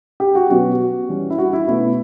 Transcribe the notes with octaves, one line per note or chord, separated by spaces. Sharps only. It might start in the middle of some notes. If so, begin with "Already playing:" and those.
G4
F#4
B2 F#3 C#4 F#4
E3 G3 C#4
E4
F#4
E4
B2 A3 C#4 E4